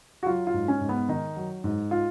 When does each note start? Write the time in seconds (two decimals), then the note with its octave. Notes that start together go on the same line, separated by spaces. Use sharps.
0.23 F#4
0.26 F#3 F4
0.47 F4
0.54 G#2
0.68 C#4
0.81 G#2
0.89 B3
1.08 D#3 D#4
1.36 F#3
1.64 G#2
1.91 F4